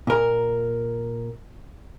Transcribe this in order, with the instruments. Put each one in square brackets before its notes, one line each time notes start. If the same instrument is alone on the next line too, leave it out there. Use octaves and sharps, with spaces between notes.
[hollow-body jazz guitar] A#2 A#4